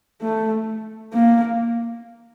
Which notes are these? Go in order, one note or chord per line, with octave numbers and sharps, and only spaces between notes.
A3
A#3